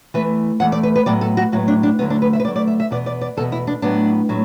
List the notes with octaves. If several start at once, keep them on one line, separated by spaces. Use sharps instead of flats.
E2 E3 A3 B4
E2 E3 A3 F#5
D5
B4
B4
A2 F#3 B3 D5
A4
F#4
A2 F#3 B3 F#4
D4
D4
D2 D3 F#3 A3 B3
D4
B4
E5
B4
D2 D3 F#3 A3 D5
D5
E5
E5
E2 B2 B3 D5
D5
D5
E2 B2 B3 A4
E4
D4
A2 F#3 B3 D4
A2 F#3